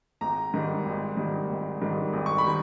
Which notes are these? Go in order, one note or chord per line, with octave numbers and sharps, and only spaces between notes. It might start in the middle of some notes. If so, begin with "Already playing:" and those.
G#1 A#5
G#2 D#3 G3
G#1
G#2 D#3 G3
G#1
G#2 D#3 G3
G#1
C#6
B5
D#3 G3